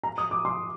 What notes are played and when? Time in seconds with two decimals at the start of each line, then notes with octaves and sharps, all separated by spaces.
0.03 A#5
0.18 D#6
0.31 D6
0.45 C6